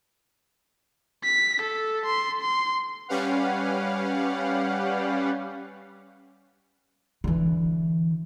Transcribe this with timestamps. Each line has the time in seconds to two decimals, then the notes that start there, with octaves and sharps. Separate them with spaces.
1.24 B6
1.62 A4
2.06 C6
2.41 C6
3.08 G3 C#4 G4 B4 F5 F#5
7.24 D3 E3